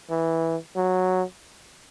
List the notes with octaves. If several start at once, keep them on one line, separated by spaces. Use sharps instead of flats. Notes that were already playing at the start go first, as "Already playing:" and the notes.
E3
F#3